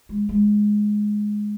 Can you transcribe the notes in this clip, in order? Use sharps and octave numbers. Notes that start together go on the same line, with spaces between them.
G#3
G#3